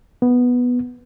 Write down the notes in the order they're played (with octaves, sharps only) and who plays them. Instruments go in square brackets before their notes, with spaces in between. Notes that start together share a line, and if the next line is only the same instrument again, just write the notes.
[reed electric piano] B3